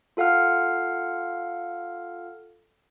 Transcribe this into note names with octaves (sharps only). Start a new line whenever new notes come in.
F4 A4 F5 F#5 F6